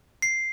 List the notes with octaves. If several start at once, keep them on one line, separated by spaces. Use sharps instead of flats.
C7